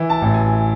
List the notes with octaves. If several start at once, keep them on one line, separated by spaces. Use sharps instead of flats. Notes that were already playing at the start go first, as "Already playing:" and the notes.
Already playing: E3
A5
A1
G#5